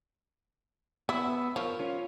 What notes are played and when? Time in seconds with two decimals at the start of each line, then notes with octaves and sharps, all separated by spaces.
1.09 B3 E4 E6
1.56 F3 A#4 C#5
1.79 C#4 F4 C#5